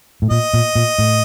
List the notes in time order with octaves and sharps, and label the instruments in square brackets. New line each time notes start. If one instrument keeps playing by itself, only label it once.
[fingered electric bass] A2
[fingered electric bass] A#2 [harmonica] D#5
[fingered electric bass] A#2
A#2
A2